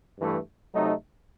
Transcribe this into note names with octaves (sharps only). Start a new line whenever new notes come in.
G2 E3 A3
C3 F#3 A3 D#4